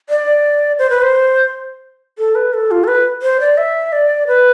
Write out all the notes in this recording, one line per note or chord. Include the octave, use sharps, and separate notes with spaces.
D5
C5
B4
C5
A4
B4
A4
F4
A4
B4
C5
D5
E5
D5
B4